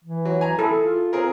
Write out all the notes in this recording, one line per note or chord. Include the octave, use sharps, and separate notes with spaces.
E3
F#3
G#5 A#5
E4 G#4 A4
F4
C4 G#4 A#4